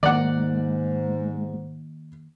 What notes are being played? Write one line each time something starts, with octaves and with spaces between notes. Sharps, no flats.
G#2 D#3 G#3 A#3 D5 F#5